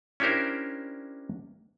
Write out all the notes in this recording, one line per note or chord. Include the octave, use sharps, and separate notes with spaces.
C#4 D4 E4 G4 A#4 C5